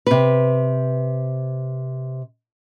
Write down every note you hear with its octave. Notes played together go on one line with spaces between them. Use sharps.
C3 B4